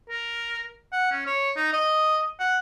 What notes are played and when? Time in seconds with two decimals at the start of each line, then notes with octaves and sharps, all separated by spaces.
0.09 A#4
0.92 F#5
1.11 C#4
1.27 C#5
1.56 D#4
1.73 D#5
2.39 F#5